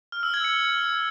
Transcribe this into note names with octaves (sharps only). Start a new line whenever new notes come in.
F6
E6
G#6
C#7